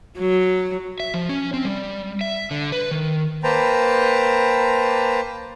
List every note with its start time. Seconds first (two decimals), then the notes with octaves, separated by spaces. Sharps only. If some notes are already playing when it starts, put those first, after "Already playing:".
0.19 F#3
1.00 E5
1.14 F3
1.29 C#4
1.54 C4
1.65 G3
2.21 E5
2.51 D3
2.72 B4
2.91 D#3
3.44 A#3 B4 C5 G5 A5 A#5